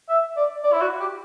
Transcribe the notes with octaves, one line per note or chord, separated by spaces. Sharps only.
E5
D5
D5
E4
F#4
G4